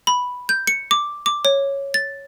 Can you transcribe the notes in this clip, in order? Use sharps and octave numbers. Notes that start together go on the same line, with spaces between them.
B5
G6
C#7
D6
D6
C#5
A6